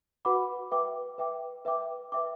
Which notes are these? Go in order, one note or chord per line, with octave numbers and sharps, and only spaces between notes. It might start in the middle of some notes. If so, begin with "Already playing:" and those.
F#4 B4 F#5 B5 D6
B4 E5 G5 D6
B4 E5 G5 D6
B4 E5 G5 D6
B4 E5 G5 D6